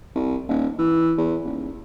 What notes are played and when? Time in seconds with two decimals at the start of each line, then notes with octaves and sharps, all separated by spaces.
0.16 C2
0.49 D#1
0.79 E3
1.18 E2
1.45 D#1